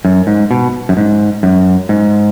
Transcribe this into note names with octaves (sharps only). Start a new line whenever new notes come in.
F#2
G#2
B2
F#2
G#2
F#2
G#2